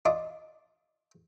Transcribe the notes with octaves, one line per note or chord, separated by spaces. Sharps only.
D4 F4 D5 D#5